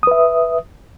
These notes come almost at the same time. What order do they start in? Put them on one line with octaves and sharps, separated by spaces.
D#6 B4 E5